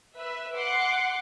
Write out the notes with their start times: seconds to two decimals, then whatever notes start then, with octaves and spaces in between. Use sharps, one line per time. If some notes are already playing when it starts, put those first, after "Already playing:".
0.16 B4 E5
0.57 F#5 C6 D6 C#7